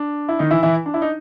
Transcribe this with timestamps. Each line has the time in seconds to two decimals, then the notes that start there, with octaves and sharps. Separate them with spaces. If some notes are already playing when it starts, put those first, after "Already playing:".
Already playing: D4
0.29 E4
0.39 D#3 D#4
0.51 E3 E4
0.63 E3 E4
0.86 D4
0.94 E4
1.02 D#4